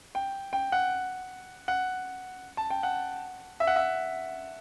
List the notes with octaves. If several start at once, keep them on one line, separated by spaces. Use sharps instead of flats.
G5
G5
F#5
F#5
A5
G5
F#5
E5
F#5
E5